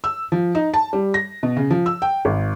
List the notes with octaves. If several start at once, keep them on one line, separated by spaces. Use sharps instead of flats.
E6
F3
D#4
A5
G3
A#6
B2
C#3
F3
E6
G5
G#1